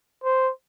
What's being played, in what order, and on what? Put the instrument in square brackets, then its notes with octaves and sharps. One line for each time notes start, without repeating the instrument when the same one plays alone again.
[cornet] C5